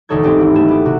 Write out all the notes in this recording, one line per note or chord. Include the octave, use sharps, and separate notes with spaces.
E1 D2 D#4 A4 C#5 G#6
G#1 C4 G4
E4
A3 A4 E7
B3 G4
C3 F#4